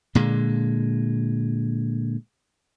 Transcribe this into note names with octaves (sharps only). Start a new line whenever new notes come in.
A#2 D3 G#3